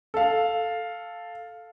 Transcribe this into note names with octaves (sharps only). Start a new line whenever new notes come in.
A4 F5